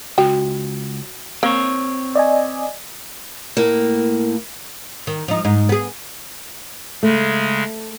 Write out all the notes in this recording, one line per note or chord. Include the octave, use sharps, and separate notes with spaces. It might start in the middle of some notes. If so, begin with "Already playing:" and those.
C#2 F#4 G5
A#3 C4 C#5
D5 D#5 G#5
A2 A#3
D#3
F3 D#4
G#2 D#4
B3 G#4
C#3 G#3 A3